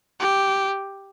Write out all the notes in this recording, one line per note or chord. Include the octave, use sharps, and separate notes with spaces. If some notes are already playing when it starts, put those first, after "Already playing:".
G4